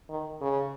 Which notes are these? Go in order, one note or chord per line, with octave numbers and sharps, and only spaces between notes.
D#3
C#3